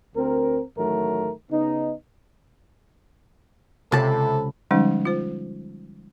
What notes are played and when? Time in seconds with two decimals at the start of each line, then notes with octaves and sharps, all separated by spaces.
0.15 D2 C4 A#4
0.77 A1 D#3 F#3 A3 A#4
1.51 C#3 B3 D#4
3.92 C#2 C3 A4 A5 B5
4.71 D3 F3 G3 G#3 C#4 D#4
5.05 F4 C5